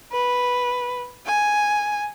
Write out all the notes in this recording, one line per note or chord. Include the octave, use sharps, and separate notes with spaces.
B4
G#5